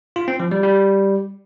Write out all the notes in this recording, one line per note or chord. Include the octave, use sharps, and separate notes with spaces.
F4
C4
F3
G3
G3